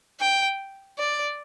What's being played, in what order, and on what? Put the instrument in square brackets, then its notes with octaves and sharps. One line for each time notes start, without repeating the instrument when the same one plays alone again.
[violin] G5
D5